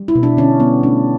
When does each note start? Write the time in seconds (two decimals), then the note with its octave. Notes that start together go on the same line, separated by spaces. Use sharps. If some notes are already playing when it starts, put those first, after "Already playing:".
Already playing: G3
0.08 E4
0.15 B2
0.23 D4
0.37 D3 C#4
0.60 G3 B3
0.83 A3 D4